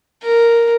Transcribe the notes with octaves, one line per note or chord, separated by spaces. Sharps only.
A#4